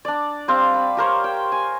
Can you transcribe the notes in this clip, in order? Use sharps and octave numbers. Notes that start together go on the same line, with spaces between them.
D4 D5
G3 C4 F5
B5
G4 A#4 C5 C#5
G5
G#5